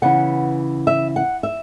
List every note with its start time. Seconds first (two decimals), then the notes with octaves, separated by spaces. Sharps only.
0.02 C#3 E3 B3 F#5
0.87 E5
1.16 F#5
1.43 E5